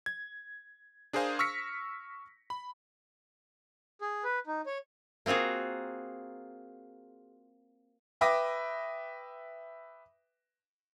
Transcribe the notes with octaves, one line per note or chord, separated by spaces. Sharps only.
G#6
D4 G#4 A#4 C5 F5 G#5
C#6 E6 F6 A#6 B6 C#7
B5
G#4
B4
D#4
C#5
A#3 C4 F4 F#4 G#4
B4 E5 G5 D6 D#6 A#6